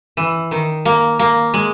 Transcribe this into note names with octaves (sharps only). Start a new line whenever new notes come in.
E3
D#3
A#3
A#3
G#3